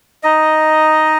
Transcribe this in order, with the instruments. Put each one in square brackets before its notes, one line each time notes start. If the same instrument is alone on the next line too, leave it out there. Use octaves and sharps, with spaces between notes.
[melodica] D#4 D#5